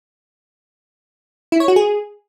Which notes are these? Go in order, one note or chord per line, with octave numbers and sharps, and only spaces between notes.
E4
C#5
F#4
G#4